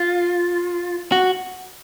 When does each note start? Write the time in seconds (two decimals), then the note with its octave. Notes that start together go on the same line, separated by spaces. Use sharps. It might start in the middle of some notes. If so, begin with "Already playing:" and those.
Already playing: F4
1.12 F#4